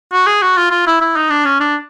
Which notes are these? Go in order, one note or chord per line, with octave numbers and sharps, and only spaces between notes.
F#4
G#4
F#4
F4
F4
E4
E4
D#4
D4
C#4
D4